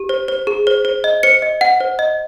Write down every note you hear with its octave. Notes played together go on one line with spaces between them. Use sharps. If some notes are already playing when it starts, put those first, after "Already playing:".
Already playing: G4
C5
C5
G#4
C5
C5
D#5
C5 C#7
D#5
F#5
C5
D#5